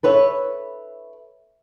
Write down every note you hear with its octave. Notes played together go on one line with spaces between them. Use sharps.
A4 B4 C#5 E5